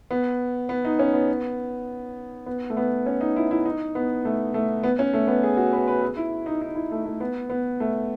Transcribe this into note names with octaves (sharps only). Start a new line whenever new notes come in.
B3
B3
D#4
C#4
B3
B3
A3
B3
C#4
D#4
E4
E4
D#4
B3
A3
A3
B3
C#4
A3
B3
G#4
F#4
B4
B4
G#4
E4
D#4
D#4
E4
A3
A3
B3
B3
A3